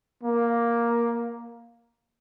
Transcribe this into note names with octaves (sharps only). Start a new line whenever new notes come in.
A#3